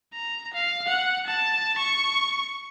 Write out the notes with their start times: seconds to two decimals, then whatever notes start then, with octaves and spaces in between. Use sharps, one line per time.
0.13 A#5
0.54 F5
0.88 F#5
1.27 A5
1.78 C#6